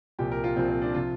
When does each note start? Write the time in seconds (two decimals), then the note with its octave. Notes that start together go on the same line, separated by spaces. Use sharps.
0.19 C2 A#2 F3 G4
0.32 A#4
0.44 F4
0.56 C2 A#2 F3 C4
0.69 C4
0.82 D4
0.94 C3 F3 F4